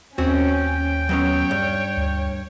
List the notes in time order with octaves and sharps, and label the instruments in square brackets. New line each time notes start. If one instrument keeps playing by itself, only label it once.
[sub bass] D#2 [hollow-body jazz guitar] C4 F#4 C#5 [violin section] C#4 [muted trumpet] G5
[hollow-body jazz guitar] F#3 B3 C#4 [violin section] C#5
[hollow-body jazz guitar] G2
[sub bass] D2